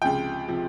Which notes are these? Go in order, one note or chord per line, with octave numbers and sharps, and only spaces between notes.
C#2 C3 F3 G5
C3 F3